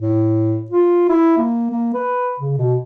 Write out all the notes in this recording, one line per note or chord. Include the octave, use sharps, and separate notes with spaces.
A2
F4
E4
A#3
A#3
B4
C#3
B2